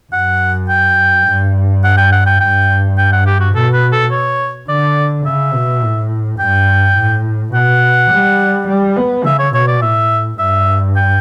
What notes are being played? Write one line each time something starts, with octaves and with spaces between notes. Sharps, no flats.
F#2 F#5
G5
G2
F#5
G5
F#5
G5
G2 G5
G5
F#5
G4
F#4
B2 A4
B4
A4
C#5
D3 D5
C#3 E5
B2
A2
G2 G5
A2
B2 F#5
G3
G3
B3
C#3 E5
C#5
B2 C#5
D5
A2 E5
G2 E5
G5